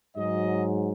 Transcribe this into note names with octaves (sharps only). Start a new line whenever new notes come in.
G#2 F#3 D#5